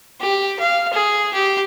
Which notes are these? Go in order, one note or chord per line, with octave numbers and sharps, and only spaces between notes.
G4
F5
G#4
G4